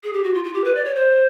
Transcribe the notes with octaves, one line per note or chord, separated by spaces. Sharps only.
G#4
G4
F#4
F4
F4
G4
B4
D5
C#5
C5